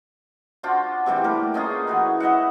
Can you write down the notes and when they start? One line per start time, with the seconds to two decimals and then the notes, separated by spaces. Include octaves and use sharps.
0.63 D4 F4 F#4 C5
1.06 C3 E3 G3 G4
1.24 A3 A#3 A#4 B4
1.54 C#4 D#4 F4 G#4
1.87 E3 F#4 B4
2.20 B4 D#5 E5 F#5